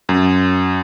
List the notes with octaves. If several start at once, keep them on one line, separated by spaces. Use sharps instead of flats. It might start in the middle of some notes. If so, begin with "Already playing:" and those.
F#2